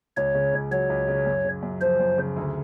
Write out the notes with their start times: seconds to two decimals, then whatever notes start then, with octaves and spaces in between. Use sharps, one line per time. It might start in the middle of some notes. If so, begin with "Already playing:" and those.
0.17 C#2 C#5
0.35 C#3
0.54 C#2
0.71 F#3 C#5
0.90 C#2
1.08 C#3
1.26 F#2
1.45 C#3
1.63 F#2
1.81 F3 C5
2.00 F#2
2.18 C#3
2.36 D2